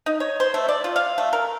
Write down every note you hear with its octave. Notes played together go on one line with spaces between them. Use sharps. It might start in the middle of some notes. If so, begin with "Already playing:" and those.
D#4
C#5
C5
A3
D5
F4
F5
A3
A#4